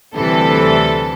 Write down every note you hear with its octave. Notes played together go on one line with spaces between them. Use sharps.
D2 C3 E3 G3 A4